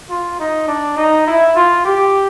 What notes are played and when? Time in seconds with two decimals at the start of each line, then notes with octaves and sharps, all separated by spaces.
0.10 F4
0.40 D#4
0.68 D4
0.97 D#4
1.27 E4
1.55 F4
1.85 G4